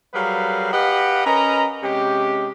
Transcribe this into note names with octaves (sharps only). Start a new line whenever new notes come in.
F#3 G3 G#4 A#4 B4 F5
G4 B4 D#5 F5 F#5
C#4 A#4 B4 D#5 A#5
C3 G#3 C#4 G4